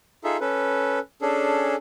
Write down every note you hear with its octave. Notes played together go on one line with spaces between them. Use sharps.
D#4 F4 G#4 A4 E5
C#4 A4 B4
C#4 D4 G#4 A4